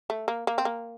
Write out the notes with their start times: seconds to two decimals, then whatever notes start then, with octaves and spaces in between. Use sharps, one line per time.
0.10 A3
0.28 A#3
0.47 A#3
0.58 C4
0.65 A#3